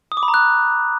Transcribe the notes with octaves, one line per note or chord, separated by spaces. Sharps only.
D#6
D6
B5
A#5
F#6